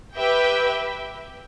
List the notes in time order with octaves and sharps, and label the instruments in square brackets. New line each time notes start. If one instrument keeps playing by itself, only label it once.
[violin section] G4 B4 E5 G5